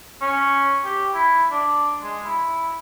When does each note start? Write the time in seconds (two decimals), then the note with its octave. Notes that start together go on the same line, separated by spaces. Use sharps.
0.22 C#4
0.85 G4
1.14 E4
1.51 D4
2.03 G#3
2.25 E4